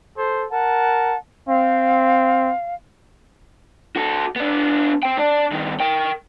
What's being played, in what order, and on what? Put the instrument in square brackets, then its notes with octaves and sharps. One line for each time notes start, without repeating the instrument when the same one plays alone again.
[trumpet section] A4 C5
[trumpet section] A#4 A5 [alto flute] F#5
[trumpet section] C4 [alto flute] F5
[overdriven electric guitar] F#4 A4
B3 D4
C5 G5
D4 D5
G2 D#3
A#4 G5